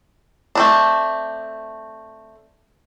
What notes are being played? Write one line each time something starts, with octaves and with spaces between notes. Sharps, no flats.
A3 C4 D4